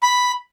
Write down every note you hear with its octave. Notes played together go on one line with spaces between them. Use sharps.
B5